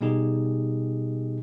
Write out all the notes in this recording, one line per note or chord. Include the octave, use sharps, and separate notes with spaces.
B2 G3 B3 D#4 G4 G#4